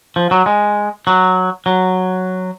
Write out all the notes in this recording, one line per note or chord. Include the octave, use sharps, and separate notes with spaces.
F3
F#3
G#3
F#3
F#3